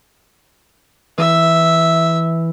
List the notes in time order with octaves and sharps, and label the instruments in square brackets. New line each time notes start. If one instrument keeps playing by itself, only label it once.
[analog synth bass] E3 [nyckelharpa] E5